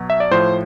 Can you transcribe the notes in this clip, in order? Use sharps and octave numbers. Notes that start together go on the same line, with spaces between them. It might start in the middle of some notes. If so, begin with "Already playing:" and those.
Already playing: B2 F#3
E5
D5
A2 F3 C5